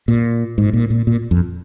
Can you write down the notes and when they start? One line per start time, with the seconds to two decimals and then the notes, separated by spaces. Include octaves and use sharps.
0.08 A#2
0.58 G#2
0.73 A#2
0.90 A#2
1.07 A#2
1.31 F2